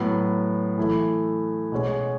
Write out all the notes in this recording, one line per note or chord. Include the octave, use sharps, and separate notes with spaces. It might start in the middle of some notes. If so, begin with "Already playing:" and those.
Already playing: A2 F#3 B3
E3 A3 E4
B2 G#3 C#4